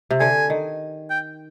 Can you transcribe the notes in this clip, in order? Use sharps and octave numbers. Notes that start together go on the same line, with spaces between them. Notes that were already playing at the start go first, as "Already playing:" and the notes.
C3
D3 G#5
D#3
G5